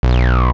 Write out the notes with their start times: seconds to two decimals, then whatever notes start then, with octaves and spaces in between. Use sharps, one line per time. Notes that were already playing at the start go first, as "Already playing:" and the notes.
0.03 B1